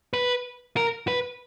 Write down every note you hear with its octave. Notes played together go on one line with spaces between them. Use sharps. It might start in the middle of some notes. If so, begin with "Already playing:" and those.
B4
A#4
B4